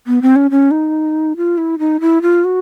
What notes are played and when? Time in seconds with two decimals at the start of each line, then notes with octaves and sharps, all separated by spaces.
0.07 B3
0.22 C4
0.36 C#4
0.51 C#4
0.71 D#4
1.37 F4
1.57 E4
1.79 D#4
2.00 E4
2.22 F4
2.44 F#4